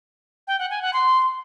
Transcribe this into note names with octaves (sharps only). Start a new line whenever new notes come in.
G5
F#5
G#5
F#5
C6